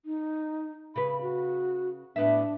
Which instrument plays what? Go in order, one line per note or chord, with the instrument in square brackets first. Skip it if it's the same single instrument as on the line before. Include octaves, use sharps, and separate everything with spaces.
[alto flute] D#4
[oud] C#3 B4 [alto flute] B5
[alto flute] F#4
[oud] A2 B3 E5 [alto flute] D4